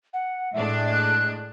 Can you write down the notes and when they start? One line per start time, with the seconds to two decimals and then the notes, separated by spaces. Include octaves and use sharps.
0.13 F#5
0.53 A2 G#3 D4 E5
0.92 F#6